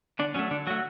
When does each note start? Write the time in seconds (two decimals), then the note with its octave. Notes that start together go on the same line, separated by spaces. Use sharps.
0.19 D3 D4
0.34 F#3 A3 C#4
0.51 D3 D4
0.67 F#3 A3 F#4